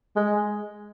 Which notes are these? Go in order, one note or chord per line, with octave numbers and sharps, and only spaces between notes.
G#3